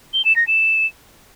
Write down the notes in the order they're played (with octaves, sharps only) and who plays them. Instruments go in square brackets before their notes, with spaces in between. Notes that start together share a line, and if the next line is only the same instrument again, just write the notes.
[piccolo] G7
E7
A#6
E7